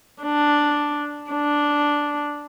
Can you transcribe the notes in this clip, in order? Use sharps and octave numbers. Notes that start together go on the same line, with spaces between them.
D4
D4